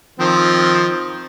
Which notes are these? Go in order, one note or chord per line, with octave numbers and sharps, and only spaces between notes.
D#3 F3 C4